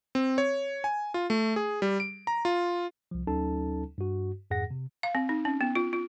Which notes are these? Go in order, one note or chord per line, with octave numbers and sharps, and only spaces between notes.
C4
C#5
G#5
F4
A3
G#4
G3
D7
A#5
F4
C2 F3
D2 F#3 C#4 D#4 A4 A5
G2 F#4
F2 G#2 G#4 F#5 A#6
C3
F5
C4
D#4
C#4
B3
F4
F4